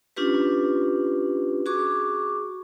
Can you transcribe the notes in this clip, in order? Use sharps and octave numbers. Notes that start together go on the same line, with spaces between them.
C#4 D4 F4 G4 B4
F#4 G#4 C#6 D6